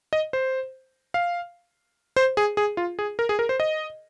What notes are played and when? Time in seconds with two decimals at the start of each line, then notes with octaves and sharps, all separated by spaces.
0.13 D#5
0.33 C5
1.14 F5
2.16 C5
2.37 G#4
2.57 G#4
2.77 F4
2.99 G#4
3.19 A#4
3.29 G#4
3.39 A#4
3.49 C5
3.60 D#5